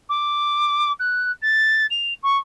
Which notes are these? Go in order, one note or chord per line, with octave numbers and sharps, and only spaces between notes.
D6
F#6
A6
F7
C#6